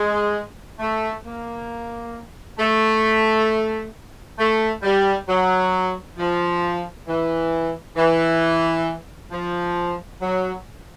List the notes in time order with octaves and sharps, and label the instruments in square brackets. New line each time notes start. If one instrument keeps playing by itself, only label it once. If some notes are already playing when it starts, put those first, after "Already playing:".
Already playing: [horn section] G#3
A3
A#3
A3
A3
G3
F#3
F3
E3
E3
F3
F#3